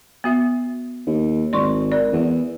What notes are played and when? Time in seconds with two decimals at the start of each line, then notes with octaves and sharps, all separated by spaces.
0.24 B3 F#4 E5
1.06 D#2
1.53 G#1 D5 C6 C#6
1.92 A#4 D5
2.12 E2